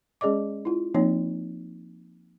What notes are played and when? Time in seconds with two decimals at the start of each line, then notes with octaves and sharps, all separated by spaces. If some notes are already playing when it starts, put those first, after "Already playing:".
0.21 G#3 C#4 G#4 D5 D#5 D6
0.65 E4 F4
0.94 F3 A#3 C4 D#4 C#5